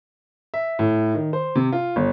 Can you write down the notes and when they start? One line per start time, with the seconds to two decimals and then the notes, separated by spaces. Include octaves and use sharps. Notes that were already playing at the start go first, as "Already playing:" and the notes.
0.54 E5
0.79 A2
1.14 D#3
1.33 C5
1.56 C3
1.72 F4
1.96 G1